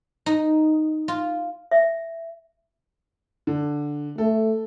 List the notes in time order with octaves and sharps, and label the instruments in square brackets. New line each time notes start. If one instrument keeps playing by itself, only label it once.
[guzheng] D#4
F4
[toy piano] E5
[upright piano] D3
[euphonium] A3 [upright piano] A4